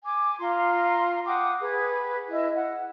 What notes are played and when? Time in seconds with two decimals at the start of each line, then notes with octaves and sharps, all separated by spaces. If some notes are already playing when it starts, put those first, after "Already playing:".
0.04 G#5 D6
0.40 F4 A#5 C6
1.26 F#5 G5 D6 D#6
1.61 G#4 B4
2.29 E4 D#5
2.55 F#5